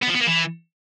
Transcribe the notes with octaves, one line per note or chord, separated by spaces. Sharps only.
B3
F3
B3
A#3
E3